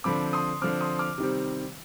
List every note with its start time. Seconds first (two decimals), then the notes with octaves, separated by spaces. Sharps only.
0.04 D3 F3 C4 B5 D6
0.33 C6 D#6
0.61 D3 F3 C4 D6 F6
0.81 C6 D#6
0.99 D6 F6
1.18 C3 D#3 G3 C4